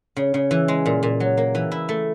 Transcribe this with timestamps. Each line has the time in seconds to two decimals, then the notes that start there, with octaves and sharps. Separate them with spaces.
0.16 C#3
0.34 C#3
0.51 E3
0.68 G#3
0.86 A#2
1.03 A#2
1.20 F#3
1.37 A#3
1.55 E3
1.72 E4
1.89 A3